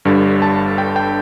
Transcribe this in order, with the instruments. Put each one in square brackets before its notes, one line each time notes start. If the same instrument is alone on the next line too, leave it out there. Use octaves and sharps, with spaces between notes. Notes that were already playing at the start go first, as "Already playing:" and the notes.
[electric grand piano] G1 G2 D3 G3
A5
G5
G5